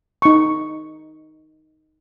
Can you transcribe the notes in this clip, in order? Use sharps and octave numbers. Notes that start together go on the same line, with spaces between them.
D#4 C#6